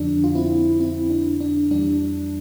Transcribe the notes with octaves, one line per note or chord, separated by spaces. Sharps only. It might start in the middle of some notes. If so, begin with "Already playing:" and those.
Already playing: F2 D3 F3 D4
F4
C4 E4
C4 E4
D4
D4
F2 E3 G3 D4